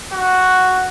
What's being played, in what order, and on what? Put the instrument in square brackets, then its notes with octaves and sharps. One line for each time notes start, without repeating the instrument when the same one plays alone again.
[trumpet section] F#4